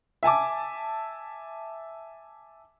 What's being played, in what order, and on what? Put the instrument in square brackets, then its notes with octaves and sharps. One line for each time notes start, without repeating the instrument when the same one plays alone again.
[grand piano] E5 G#5 A5 D6